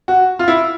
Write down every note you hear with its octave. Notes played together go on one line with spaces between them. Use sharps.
F#4
F4
E4